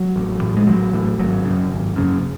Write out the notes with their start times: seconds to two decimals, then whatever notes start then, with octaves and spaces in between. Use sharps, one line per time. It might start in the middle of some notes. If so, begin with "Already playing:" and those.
Already playing: F#3
0.16 A1
0.42 A2
0.57 G#3
0.67 A1 F#3
0.93 A2
1.19 G#1 F#3
1.44 C#3
1.50 F#2
1.71 G#1
1.96 F#2 C#3